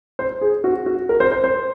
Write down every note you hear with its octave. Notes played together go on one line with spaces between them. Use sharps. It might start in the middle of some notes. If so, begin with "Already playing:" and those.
C5
G#4
F#4
F#4
A#4
C5
C5
C5